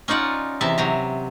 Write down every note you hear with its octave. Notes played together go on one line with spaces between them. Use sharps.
C#4 D#4 F4 D5 F#5
E2 C3 E5 A5
C3 F#3 A#5